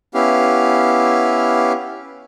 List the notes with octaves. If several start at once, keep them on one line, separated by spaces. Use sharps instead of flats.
B3 C#4 E4 G4 F5